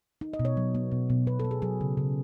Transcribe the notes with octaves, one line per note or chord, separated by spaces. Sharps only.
D#4
D#5
B2
C#5
F#3
B3
B2
B2
B2 B4
B3 A4
G#4
F#3 G#4
C#3
C#3